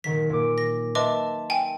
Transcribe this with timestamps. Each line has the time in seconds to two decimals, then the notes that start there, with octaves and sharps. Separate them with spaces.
0.04 A#2 D#3 F#3 B6
0.30 A#2 D6
0.58 A#6
0.95 B4 D#5 E5 A5 C6 D6
1.50 G5 G#5